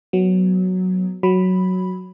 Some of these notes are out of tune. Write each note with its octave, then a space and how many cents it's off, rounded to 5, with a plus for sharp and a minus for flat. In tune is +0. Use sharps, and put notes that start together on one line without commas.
F#3 +0 B3 +0
F#3 +0 B5 +0